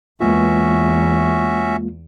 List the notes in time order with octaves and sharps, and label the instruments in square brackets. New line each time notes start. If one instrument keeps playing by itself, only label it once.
[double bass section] E2 [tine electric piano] G#3 A#3 F4 [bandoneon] C#4 F#4 E5